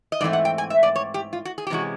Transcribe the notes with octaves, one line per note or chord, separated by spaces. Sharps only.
D#5
G#2 E3 A3 C4 D5
F#5
G5
G#5
E5
D5
C#5
G4
F4
F#4
G#4
G4
C3 E3 G#3 C#4 F#4